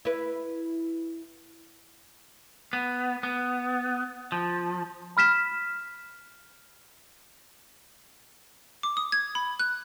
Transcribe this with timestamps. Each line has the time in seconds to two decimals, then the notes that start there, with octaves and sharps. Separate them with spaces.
0.05 E4 B4
2.73 B3
3.23 B3
4.32 F3
5.17 B5 F6 B6 E7
8.83 D6
8.97 D#6
9.12 G#6
9.35 B5
9.60 F#6